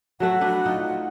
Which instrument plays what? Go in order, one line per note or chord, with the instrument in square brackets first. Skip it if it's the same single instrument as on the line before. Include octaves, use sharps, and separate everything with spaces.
[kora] F#3 A3 F#4 [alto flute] F#5
[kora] D4 B4
D#4 F4